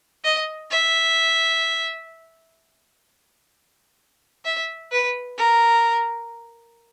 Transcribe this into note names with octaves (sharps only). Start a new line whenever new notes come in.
D#5
E5
E5
B4
A#4